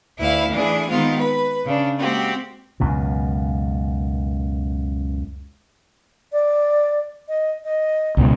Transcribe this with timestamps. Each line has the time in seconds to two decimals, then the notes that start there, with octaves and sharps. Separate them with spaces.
0.18 D2 E4 B4 E5 F5
0.51 E3 A3 D4 G#4
0.87 D#3 G#3 B3 C4 F4
1.18 B4
1.65 C#3 D4
1.98 G#3 A#3 C4 F#4 G4
2.80 C#2 F#2 B2
6.32 D5
7.28 D#5
7.64 D#5
8.17 C#2 B2 G#3